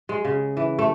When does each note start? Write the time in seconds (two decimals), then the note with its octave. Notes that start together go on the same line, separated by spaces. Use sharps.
0.09 G#3
0.25 C#3
0.57 E3
0.79 A3